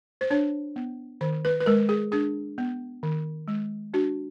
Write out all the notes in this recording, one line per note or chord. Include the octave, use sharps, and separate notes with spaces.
C5
D4 C#5
B3
D#3 C5
B4
B4
G#3 A#4
G#4
D4 G#4
B3
D#3
G#3
D4 F#4